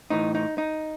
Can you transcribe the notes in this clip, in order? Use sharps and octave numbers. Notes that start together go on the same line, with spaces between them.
A2 E3 D#4
D#4
D#4